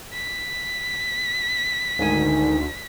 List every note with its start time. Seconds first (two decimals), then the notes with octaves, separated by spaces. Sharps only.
0.13 B6
1.99 D2 G#2 D#3 G#5